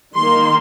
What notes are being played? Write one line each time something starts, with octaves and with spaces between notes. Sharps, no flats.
D#3 A#3 D#4 C6